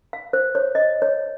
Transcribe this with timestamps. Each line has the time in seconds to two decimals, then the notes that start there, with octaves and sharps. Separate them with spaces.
0.13 F5
0.33 C5
0.55 C#5
0.75 D#5
1.02 C#5